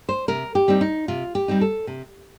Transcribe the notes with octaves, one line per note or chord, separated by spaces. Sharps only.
C5
C3 A#4
G4
G3 C4 D#4
D#4
C3 F4
G4
G3 C4 D#4
A4
C3